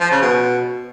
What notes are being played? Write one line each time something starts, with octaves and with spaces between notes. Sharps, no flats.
F3
C#3
B2